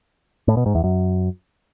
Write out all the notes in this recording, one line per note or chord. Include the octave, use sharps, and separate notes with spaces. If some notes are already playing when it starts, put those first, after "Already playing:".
A2
B2
G#2
E2
F#2